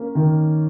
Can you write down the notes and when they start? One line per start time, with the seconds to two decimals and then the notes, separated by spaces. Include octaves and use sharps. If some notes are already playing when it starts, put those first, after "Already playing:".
Already playing: A#3 C#4
0.15 D#3